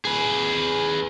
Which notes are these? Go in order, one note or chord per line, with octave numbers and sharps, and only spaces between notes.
G#4 B4